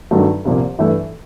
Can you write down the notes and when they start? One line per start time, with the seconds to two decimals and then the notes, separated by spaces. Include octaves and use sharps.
0.11 G2 D#3 F#3 A3
0.45 C2 A#2 F3 A#3
0.78 G2 E3 A3